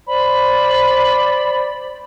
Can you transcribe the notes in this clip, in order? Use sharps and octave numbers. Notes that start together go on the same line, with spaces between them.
C5 D5 B5